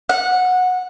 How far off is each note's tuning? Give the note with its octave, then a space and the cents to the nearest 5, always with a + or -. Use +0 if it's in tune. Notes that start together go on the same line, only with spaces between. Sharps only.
F#5 -15